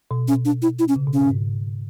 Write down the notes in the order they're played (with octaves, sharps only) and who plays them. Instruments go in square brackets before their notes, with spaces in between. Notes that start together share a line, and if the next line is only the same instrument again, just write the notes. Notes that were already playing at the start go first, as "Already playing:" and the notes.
[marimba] B2
[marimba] B2 [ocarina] C#4
[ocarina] D4
E4
E4
C#4
[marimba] C#3
B2
[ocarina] C#4
[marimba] G#2
G#2